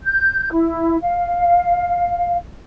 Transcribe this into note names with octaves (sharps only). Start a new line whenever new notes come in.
G6
E4
F5